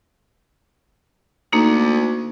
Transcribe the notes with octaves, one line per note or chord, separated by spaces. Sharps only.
D2 A#3 D#4